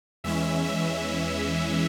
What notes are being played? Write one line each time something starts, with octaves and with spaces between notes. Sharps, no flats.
E2 E3 G#3 C#4 E5
E5